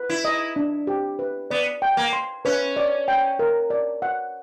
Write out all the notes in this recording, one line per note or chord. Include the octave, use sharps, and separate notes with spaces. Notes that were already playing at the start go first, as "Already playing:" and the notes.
Already playing: B4
E4
D#5
D4
G4
B4
B3 D5
G5
A#3
C6
C#4 B4
D5
G5
A#4
D5
F#5